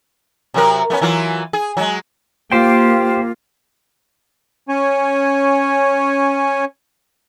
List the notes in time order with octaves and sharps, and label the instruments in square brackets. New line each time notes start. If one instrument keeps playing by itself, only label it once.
[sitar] C3 F#3 A#4
A3 B3 C#4
E3 F#3 F4
G#4
F#3 G#3
[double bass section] A#3 [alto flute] F4 [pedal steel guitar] G4 C5 G5
[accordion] C#4 C#5 G#5